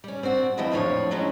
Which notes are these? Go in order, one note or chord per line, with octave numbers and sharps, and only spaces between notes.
G3 C#4
C4 D4 F#4
E2 E3 F3 E4 D#5 G5
F2 A2 F3 D4 C#5
F#3 G#3 C#4 E4